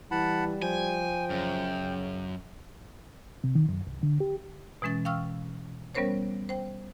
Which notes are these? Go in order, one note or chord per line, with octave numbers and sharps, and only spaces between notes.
E3 G3 F#5 A5 B5
F3 G5 G#5
F#2 C#3
C3
D#3
F#2
C2
D3
G4
B2 E3 G#3 C#4 A6
F5 G5 C#6 E6 F6
G3 B3 C#4 A#4 C5 C#5
C5 G5